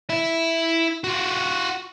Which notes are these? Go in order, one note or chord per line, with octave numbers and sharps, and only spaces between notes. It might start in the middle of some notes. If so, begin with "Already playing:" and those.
E4 E5
F4 F#4